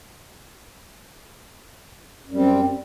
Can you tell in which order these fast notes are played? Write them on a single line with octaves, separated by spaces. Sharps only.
F#2 G3 C4